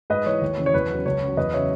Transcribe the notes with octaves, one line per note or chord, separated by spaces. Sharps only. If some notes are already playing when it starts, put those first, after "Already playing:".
G#2 B4 D#5
E3 C#5
D#2
C#3 E3
C#5
E2 B4
C#3 F#3
C#2 C#5
C#3 F#3
E2 B4 D#5
C#3 F#3 C#5 E5